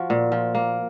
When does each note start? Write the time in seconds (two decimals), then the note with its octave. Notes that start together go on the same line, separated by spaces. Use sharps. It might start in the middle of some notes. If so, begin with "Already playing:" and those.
Already playing: F3 F#4
0.10 A#2
0.32 F3
0.55 A#3